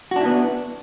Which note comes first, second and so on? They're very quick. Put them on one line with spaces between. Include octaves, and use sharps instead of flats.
F#4 D4 E4 B3